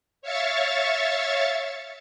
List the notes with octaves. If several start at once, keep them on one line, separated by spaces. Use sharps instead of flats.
C#5 E5 F5 C#6 A6